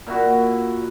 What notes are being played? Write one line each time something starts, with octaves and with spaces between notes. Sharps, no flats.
A#2 E4 F#4